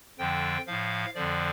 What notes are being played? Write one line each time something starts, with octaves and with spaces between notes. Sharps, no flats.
F2 D3 F3 G5
A2 F3 F5
F2 D3 F3 D5